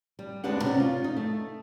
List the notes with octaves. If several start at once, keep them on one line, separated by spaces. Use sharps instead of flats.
G3
D2 G#3 B3 D4 G4 F#5
C3 C#4 D5
F4
D#4
A3